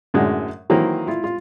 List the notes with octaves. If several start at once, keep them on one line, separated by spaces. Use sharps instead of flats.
F#2 A2 D3 F#3 G#3
D#3 E3 F#3 A#3 C4
E4 F4
F4